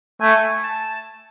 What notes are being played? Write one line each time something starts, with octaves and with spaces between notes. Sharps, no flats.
A3 G#5
A5